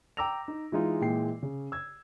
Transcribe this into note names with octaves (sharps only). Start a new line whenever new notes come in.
G5 A#5 D6 E6 A#6 F7
D#4
E3 G#3 D#4 F4
A#2 E3 G#3 G5 C7
C#3
E6 G#6